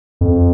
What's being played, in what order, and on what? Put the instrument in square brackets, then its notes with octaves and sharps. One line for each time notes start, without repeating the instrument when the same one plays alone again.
[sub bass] F2